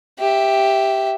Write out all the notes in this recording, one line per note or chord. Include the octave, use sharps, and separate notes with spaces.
G4 E5